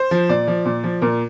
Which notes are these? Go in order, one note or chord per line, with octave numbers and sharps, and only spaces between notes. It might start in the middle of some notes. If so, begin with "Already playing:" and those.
Already playing: C5
F3
A#2 D5
F3
A#2
F3
A#2 A#4